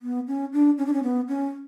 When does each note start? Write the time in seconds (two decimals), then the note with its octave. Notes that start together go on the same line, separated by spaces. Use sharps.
0.02 B3
0.28 C#4
0.53 D4
0.78 C#4
0.86 D4
0.93 C#4
1.03 B3
1.28 C#4